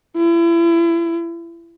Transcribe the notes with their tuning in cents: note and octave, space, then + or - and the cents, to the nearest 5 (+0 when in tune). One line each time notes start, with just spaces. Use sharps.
E4 +35